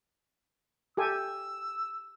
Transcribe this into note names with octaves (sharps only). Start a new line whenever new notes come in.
G4 A4 G#5 E6